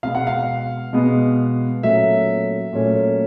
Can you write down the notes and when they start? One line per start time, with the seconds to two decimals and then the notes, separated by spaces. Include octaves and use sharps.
0.03 B2 G#3 B3 F5
0.15 F#5
0.27 F5
0.93 B2 G#3 B3
1.83 A#2 F#3 A3 C#4 E5
2.73 A#2 F#3 A3 C#4